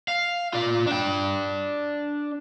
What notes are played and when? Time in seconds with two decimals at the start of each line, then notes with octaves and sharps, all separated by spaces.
0.08 F5
0.53 F4 D5
0.87 D4 G5